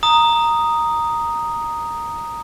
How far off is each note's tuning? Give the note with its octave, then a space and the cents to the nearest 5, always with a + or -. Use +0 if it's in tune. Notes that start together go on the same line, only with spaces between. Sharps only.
A#5 +0 D#6 +0